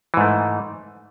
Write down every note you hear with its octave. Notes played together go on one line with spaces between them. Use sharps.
G#2 E3 A3